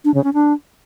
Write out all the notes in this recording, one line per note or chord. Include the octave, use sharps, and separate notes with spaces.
D4
C#3
C#4
D4